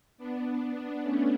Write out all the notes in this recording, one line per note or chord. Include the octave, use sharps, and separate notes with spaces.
B3 D4
B3 D4
A3 C#4